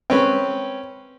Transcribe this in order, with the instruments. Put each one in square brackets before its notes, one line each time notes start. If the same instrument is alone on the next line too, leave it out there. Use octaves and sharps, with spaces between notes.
[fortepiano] C4 C#4 B4